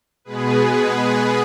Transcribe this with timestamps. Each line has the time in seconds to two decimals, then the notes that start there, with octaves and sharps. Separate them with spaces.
0.25 B2 G#3 B3 G#4 B4
0.73 G#4 B4